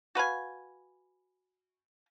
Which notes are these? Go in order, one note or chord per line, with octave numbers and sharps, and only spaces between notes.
F#4 B4 F5 G#5